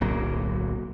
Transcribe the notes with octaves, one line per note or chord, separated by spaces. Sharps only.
D1 B1 F#3 A#3